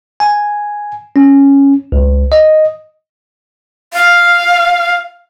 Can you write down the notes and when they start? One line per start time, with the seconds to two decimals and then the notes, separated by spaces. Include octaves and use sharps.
0.20 G#5
1.16 C#4
1.92 C#2
2.32 D#5
3.94 F5